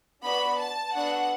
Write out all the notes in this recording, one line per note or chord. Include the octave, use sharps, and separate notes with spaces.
B3 D4 F#4 B5
A5
B3 D4 F#4 A4 F#5